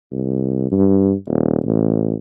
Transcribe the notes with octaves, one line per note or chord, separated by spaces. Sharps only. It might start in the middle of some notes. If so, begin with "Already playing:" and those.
C2
G2
D#1
A1